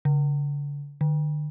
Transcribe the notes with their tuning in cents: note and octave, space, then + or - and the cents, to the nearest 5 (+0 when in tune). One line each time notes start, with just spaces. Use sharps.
D3 -40
D3 +40